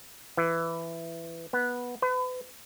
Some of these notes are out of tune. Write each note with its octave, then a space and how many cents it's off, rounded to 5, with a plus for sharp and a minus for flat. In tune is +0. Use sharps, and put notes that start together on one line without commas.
E3 +10
B3 -10
B4 +40